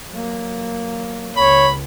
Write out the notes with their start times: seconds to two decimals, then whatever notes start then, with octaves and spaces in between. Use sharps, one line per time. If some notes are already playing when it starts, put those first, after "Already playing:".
0.11 F#3 A#3
1.37 C#2 C#5 B5